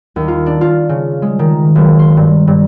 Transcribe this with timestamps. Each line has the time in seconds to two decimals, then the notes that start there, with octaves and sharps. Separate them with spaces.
0.16 D#2
0.28 F4
0.46 D4
0.61 F4
0.89 C#3
1.22 G#3
1.39 D#3
1.75 F#1
1.99 C6
2.17 G2
2.47 G2